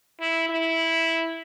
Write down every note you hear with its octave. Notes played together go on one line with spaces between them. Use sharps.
E4
E4